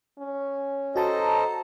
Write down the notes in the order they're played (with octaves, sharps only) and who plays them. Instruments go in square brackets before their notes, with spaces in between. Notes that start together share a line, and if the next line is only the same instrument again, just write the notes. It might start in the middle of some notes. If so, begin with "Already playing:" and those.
[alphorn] C#4
[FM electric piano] F#4 A5 A#5 [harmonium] A4 C5 D#5